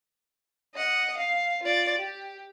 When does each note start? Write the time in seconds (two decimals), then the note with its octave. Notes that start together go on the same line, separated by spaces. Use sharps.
0.75 D#5 F#5
1.17 F5
1.63 F4 D5
1.98 G4